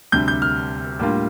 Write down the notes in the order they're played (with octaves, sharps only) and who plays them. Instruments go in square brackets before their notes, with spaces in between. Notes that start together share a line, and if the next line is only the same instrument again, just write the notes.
[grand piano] D2 C3 G3 D4 G6
G6
F6
A2 G3 A#3 D4 F4